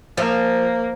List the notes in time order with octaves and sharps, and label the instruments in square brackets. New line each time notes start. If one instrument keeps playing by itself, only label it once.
[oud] F3 [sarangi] A#3